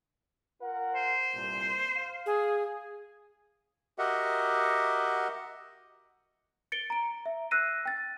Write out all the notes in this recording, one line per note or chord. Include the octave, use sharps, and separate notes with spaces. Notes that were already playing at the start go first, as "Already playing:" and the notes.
F4 A#4 F#5
C5
C2 G2 A#2
F5
G#4
F#4 G4 A#4 D#5 E5 F#5
A6 C#7 D7 G7
A#5 D7
E5
E6 F#6 A#6 C7 D#7
G5 A6